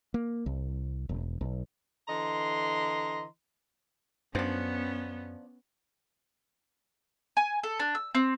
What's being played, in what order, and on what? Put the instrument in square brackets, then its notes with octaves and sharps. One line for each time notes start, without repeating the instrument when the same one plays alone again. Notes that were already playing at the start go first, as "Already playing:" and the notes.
[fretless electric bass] A#3
C2
E1
B1
[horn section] D3 E3 D#5 A#5 C6
[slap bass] F#2 [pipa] F3 D4 [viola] B3 [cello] C#4
[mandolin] G#5
A4
D4
E6
C4